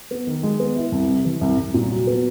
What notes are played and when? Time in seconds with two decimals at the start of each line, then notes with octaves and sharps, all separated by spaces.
0.11 B3
0.27 D#3
0.43 G#3
0.60 B3
0.76 E4
0.92 C2
1.08 C3
1.25 E3
1.41 C2
1.58 C2
1.74 A#2
1.91 F#3
2.07 B3